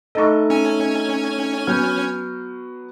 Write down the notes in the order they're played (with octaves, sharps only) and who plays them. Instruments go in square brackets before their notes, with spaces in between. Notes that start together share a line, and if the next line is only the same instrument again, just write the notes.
[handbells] A3 D#4 A4 [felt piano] D#5 C#6
[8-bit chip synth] C#4 G#5
[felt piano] F#3 B3 [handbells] F6 G6